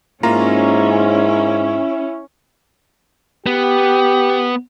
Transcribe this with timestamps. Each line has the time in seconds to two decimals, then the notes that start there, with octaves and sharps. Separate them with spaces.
0.23 G#2 A#3 C#4 E4 F4 A#5
3.46 B3 G4